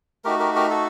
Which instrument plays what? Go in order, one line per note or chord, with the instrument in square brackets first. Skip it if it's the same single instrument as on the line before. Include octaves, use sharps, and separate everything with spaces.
[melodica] A3 D#4 F#4 G4 A#4
G4 A#4
G4 A#4
F#4 A4